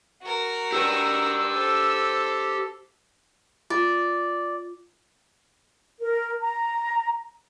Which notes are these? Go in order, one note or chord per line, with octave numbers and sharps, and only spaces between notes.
F#4 A#4
G4 B4 E6
A4 C5
F4 D5
A#4
A#5